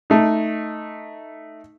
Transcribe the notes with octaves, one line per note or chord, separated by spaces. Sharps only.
A3 D#4